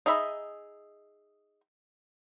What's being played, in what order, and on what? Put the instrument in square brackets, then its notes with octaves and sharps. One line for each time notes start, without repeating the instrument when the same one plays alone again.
[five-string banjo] D#4 G#4 D#5 E5 B5